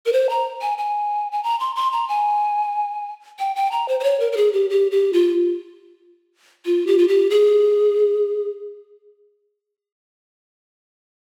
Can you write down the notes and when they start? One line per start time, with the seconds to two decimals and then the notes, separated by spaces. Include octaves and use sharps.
0.06 A#4
0.13 C5
0.30 A#5
0.62 G#5
0.78 G#5
1.32 G#5
1.43 A#5
1.60 C6
1.76 C6
1.92 A#5
2.08 G#5
3.39 G5
3.56 G5
3.72 A#5
3.88 C5
4.00 C5
4.04 C#5
4.20 A#4
4.32 A#4
4.37 G#4
4.53 G4
4.70 G4
4.91 G4
5.13 F4
6.65 F4
6.87 G4
6.98 F4
7.08 G4
7.30 G#4